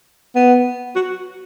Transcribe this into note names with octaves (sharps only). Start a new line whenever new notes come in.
B3
F#4